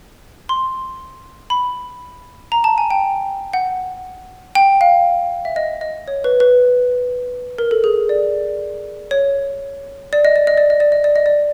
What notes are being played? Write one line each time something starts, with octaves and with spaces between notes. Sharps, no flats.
C6
B5
A#5
A5
G#5
G5
F#5
G5
F5
E5
D#5
D#5
C#5
B4
B4
A#4
A4
G#4
D5
C#5
D5
D#5
D5
D#5
D5
D#5
D5
D#5
D5
D#5
D5